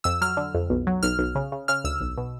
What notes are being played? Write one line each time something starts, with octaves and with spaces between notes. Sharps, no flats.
F2 E6
F#3 F6
D3
F2
B1
F#3
B1 F6
B1
C#3
C#3
C#3 F6
D2 E6
B1
B2